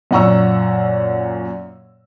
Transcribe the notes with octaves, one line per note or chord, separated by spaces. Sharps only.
F#2 A#2 F#5 A#5 C#6 E6